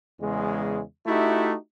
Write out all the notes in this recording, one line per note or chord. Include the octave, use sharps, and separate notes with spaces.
E2 C#3 G#3
A3 D#4 E4 F#4 G4